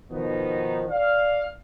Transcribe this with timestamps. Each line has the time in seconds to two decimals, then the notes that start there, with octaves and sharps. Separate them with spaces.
0.10 B2 D#3 F3 B3 D#4
0.88 D5 F5